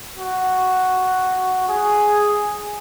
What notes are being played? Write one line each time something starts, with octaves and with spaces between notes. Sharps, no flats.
F#4
G#4